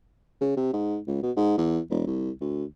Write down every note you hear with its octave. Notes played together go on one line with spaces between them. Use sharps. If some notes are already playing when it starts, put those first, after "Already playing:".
C#3
C3
G#2
C#2
B2
G#2
E2
E1
C2
D2